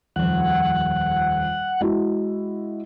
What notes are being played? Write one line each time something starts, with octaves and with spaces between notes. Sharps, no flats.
D#1 F2 F#5
G#3 E4 F#4